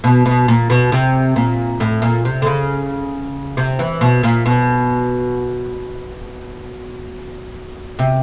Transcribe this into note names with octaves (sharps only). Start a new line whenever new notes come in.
B2
B2
A#2
B2
C3
A#2
A2
A#2
C3
D3
C#3
C3
E3
B2
A#2
B2
C3